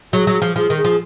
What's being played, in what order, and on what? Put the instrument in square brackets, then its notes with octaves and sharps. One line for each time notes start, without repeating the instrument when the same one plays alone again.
[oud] F#3 [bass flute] G#4
[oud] F#3
F3
[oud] F3 [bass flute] G#4
[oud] D#3
[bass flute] G#4
[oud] F3